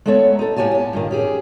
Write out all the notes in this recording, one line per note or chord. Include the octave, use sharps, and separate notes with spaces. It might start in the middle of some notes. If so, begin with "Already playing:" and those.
G#3 A3 B3 A4 C#5
D#4 A4
A2 A#3 G4 C#5 G#5 A5
B3 A5
G2 A#2 D#3
C#4 G4 G#4